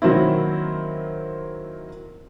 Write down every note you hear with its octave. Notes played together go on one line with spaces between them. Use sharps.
D#3 F#3 A#3 C4 E4